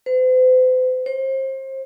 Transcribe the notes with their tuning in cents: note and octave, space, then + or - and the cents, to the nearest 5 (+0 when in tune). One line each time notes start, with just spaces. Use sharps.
C5 -45
C5 +30